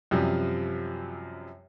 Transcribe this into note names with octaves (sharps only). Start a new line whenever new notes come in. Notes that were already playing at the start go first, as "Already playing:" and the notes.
F#2 C3 F3 G3